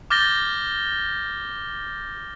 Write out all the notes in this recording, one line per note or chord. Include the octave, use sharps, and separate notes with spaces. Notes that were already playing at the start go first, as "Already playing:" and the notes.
D6 F6 G6 A6 A#6 G7